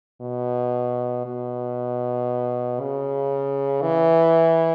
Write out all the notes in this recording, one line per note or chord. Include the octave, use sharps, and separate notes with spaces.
B2
B2
C#3
E3